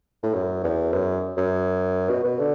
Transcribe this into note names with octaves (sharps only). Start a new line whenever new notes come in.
A2
F#2
E2
F#2
F#2
B2
B2
D3